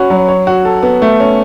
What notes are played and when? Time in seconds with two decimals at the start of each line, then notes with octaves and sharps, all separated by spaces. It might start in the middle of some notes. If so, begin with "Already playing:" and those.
Already playing: C#4 F#4 B4
0.10 F#3
0.29 C#5
0.47 F#4
0.65 A4
0.83 B3
1.02 A3
1.20 C#4